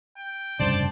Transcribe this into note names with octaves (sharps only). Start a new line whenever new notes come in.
G5
F1 G2 C#3 C5 D5 A5